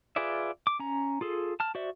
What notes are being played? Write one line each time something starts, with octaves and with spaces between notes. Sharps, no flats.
F4 G#4 B4 D5 E5
D6
C#4 A#5
F4 G#4 A4
A5 F6
F#4 C5 D5 E5